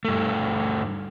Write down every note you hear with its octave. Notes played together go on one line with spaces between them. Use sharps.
G2 A3